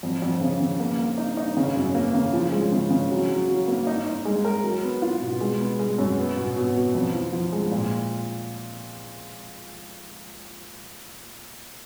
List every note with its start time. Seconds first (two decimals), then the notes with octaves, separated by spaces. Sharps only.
0.03 F2
0.22 F2
0.41 C#3
0.60 C#3
0.80 A#3
0.99 A#3
1.18 D#4
1.37 D#4
1.57 C#3
1.76 F#2
1.95 A#3
2.14 C#3
2.33 F3
2.52 G#3
2.72 C#3
2.91 C#3
3.10 F#3
3.29 F#3
3.48 F#3
3.68 A#3
3.87 D#4
4.06 D#4
4.25 G#3
4.45 A#4
4.64 F#3
4.83 B3
5.02 F4
5.22 B2
5.41 G#3
5.60 B3
5.79 G#3
5.98 F#2
6.18 B3
6.36 B2
6.56 B2
6.75 B2
6.95 F2
7.14 F3
7.33 F3
7.52 G#3
7.71 A#2